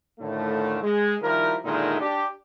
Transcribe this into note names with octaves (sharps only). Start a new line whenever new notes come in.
A2 D3 D#3 F3 A3
G#3
D#3 F3 G3 E4 A#4
A#2 D3 D#3 G#3 D#4 E4
D4 G4